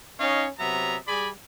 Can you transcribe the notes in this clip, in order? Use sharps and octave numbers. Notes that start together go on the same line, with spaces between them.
C#4 D#4 C#5 D#5 F5
C3 F#3 B3 E5 A#5
G3 G#4 D5 G#5 B5